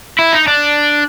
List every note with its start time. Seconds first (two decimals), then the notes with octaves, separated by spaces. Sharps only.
0.19 E4
0.33 D#4
0.48 D4